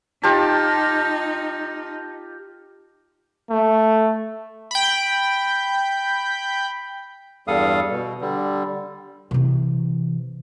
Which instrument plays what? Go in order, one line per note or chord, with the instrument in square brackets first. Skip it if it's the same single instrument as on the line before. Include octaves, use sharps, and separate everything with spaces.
[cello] D#4 [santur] F4 G4 A5
[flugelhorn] A3
[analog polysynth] G5 B5
[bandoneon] E2 G2 G3 A4 F5 D#6
B2
D3 G3
[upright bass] C3 E3